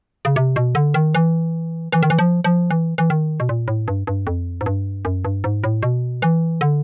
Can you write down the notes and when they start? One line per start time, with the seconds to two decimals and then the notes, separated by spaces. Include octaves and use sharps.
0.25 C#3
0.36 C3
0.56 B2
0.75 D3
0.94 D#3
1.15 E3
1.92 E3
2.03 D#3
2.10 E3
2.19 F3
2.44 F3
2.71 E3
2.98 E3
3.10 D#3
3.40 B2
3.49 A#2
3.68 A2
3.88 G2
4.07 G2
4.27 F2
4.61 G#2
4.66 G2
5.05 F#2
5.25 G2
5.44 G#2
5.64 A2
5.83 B2
6.22 E3
6.61 D3